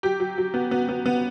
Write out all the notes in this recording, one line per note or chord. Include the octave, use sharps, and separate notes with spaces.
F#3 G4
F#3
F#3
B3
B3
B3
B3